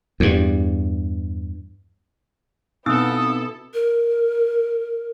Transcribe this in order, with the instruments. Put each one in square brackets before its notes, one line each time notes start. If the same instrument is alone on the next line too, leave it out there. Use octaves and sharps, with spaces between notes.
[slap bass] E2 G2
[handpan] B2 B3 [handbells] C4 D#4 E6 [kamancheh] E4 A4 [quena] D#6
[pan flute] A#4